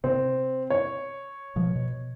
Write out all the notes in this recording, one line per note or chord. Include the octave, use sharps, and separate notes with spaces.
C3 C4
C#5
B2 F3
B2